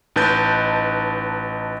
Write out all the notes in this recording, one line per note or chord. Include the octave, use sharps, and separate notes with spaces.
A1 D#4 B4 A5 G6 A6